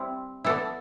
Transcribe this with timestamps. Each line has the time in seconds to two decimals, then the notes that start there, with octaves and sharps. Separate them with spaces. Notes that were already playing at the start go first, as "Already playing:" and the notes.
Already playing: G3 C4 E4
0.44 B3 E4 A4 D5